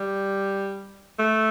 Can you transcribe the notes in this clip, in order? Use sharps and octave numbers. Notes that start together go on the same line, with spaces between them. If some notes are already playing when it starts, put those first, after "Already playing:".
Already playing: G3
A3